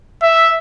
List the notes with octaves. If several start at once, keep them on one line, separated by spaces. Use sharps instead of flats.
E5